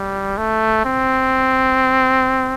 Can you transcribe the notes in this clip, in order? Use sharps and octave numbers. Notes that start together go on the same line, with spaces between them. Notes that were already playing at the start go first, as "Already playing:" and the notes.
Already playing: G3
A3
C4